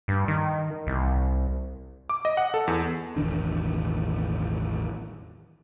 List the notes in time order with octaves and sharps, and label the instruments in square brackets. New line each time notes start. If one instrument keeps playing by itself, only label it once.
[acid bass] G2
D#3
C2
[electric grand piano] D6
D#5
F#5
A4
E2
[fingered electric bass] E1 A1 D#3 D4